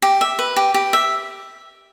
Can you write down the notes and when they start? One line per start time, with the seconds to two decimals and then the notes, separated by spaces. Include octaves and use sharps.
0.02 G4
0.21 E5
0.39 B4
0.56 G4
0.74 G4
0.93 E5